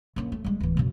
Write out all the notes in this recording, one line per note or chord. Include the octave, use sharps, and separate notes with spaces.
A#1 C#4
A3
G3 G#3
D1 E3
F#2 B2